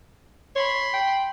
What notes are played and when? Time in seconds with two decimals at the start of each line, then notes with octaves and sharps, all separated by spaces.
0.56 C#5 B5 C6
0.94 G5